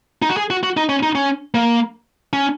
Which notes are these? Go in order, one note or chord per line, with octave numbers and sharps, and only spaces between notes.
D#4
F#4
G#4
F#4
F#4
D#4
C#4
D#4
C#4
A#3
C#4